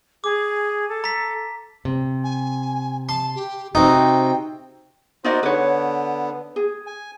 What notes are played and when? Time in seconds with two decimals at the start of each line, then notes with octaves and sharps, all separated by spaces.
0.24 G#4 D6
0.89 A4
1.04 A#5 B6
1.85 C3
2.24 G#5
3.09 A5 C6
3.35 G4
3.75 C3 C4 D#4 F#4 G5
5.24 D#4 F#4 A#4 C5 D5 D#5
5.43 D3 B3 B4 C#5
6.56 G#4
6.87 G#5